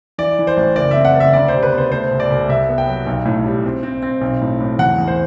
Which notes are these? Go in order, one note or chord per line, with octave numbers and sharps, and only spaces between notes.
E3 D5
E3
C5
A1
F#1 D5
C4 E5
F#5
F#1
E5
D2 D5
C5
C3
B4
B3
C5
A3 C5
C2
D5
C2
C2 E5
B3
G5
F#3
B1
A2
G3
C4
C4
C4
B1
A2
A2
E2 F#5
E2
C5